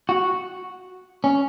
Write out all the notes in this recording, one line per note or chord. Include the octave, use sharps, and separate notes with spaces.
F#4
C#4